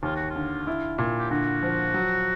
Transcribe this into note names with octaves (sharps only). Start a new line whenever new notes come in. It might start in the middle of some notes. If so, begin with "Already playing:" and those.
D#2 F4
F#4
F4
D3
E4
A#2
G4
D3 F#4
F3
F#3